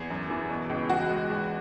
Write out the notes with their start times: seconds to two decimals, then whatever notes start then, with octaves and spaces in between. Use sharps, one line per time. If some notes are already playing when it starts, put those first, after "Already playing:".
Already playing: E2 G#4
0.10 F#2
0.30 E3
0.50 B2
0.70 C#2
0.89 E2 F#4
1.10 G#3
1.30 E2